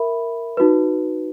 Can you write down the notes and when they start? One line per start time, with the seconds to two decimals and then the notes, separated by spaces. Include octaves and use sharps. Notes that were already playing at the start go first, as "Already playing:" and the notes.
Already playing: A#4 E5 B5
0.57 D#4 F#4 B4